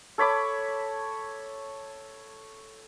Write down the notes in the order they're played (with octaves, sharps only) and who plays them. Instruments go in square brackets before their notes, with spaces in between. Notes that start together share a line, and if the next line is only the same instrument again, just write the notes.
[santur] A4 C#5 B5 D6